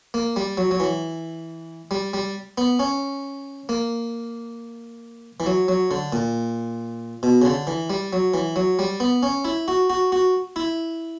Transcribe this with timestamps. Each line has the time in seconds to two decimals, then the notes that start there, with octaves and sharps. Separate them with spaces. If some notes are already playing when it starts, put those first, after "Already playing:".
0.14 A#3
0.36 G3
0.57 F#3
0.71 F#3
0.80 E3
1.91 G3
2.14 G3
2.58 B3
2.79 C#4
3.69 A#3
5.40 E3
5.46 F#3
5.68 F#3
5.91 D3
6.13 A#2
7.23 B2
7.42 C#3
7.45 D3
7.67 E3
7.90 G3
8.13 F#3
8.34 E3
8.56 F#3
8.79 G3
9.00 B3
9.23 C#4
9.45 E4
9.68 F#4
9.90 F#4
10.12 F#4
10.56 E4